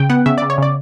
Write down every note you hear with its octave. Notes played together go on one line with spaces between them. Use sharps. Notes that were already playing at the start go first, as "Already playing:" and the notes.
Already playing: C#3 G5
B3 F#5
C#3 E5
C#3 D5
C#5
C#3 D5